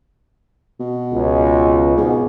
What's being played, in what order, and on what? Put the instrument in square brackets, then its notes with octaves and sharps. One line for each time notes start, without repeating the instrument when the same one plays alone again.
[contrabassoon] B2
[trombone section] C#2
[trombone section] G#2 [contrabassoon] B2